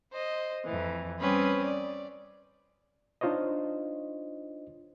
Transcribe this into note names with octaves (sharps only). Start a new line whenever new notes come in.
C5 D#5
F2 E3
G3 C4 C#4 B4 D#6
D5
D4 D#4 F4 C5 C#5 D#5